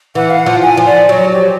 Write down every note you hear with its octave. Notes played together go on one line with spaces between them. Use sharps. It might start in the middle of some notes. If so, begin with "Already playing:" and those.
E3 F#5
F5
F#5
F3
G#5
F3
D5
F#3 C#5
G4